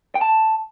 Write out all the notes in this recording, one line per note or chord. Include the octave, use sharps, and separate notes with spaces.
G5
A5